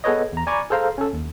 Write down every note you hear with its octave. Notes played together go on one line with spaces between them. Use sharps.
B3 G#4 A4 B4 C#5 D#5
E2 A#5
D5 G#5 A#5 B5 C#6 D6
G#4 A4 C5 F5 A#5
C#4 A4
D#2